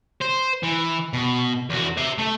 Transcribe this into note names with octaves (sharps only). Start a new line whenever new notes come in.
C5
E3
B2
E2 F#4
C5 E5
A3